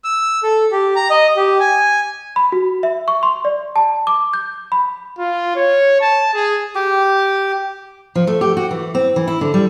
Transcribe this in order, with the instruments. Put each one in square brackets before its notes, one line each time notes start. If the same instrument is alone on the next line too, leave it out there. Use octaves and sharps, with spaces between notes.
[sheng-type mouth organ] E6
A4
G4
A#5
D#5
G4
G#5
[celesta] B5
F#4
E5
C#6
C6
D5
A5
D6
G6
B5
[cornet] F4
C#5
A5
G#4
[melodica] G4
[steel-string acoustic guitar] F3
A3
G4
F#4
E3
C4
E3
E4
D3
G3